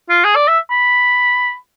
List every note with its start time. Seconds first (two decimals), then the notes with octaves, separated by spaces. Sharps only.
0.10 F4
0.24 G#4
0.36 D5
0.48 E5
0.71 B5